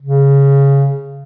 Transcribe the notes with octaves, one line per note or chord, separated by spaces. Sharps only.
C#3